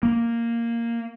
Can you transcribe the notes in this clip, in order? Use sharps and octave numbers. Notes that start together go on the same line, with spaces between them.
A#3